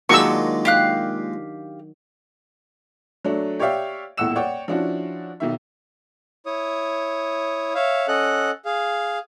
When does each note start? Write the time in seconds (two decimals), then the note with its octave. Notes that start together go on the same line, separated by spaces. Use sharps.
0.09 A#2 D#3 F#3 G#3 D4 C#6 E6
0.65 G4 F5 F#6
3.25 F#3 A3 D4
3.59 G4 C#5 D5 E5 F5 G5
4.17 D#1 E2 A2 F#5 E6 E7
4.36 C#5 D5 F#5 G5
4.68 F3 C#4 D4 E4 F#4
5.40 B1 D#3 E5
6.46 E4 C#5 D#6
7.75 C#5 E5 F5
8.08 C#4 A4 D#5 F#5 F#6
8.65 G#4 F5